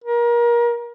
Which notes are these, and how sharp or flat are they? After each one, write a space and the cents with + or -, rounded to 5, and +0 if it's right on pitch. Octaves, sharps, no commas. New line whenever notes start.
A#4 +30